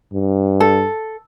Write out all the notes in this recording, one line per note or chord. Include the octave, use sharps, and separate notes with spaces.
G2
A4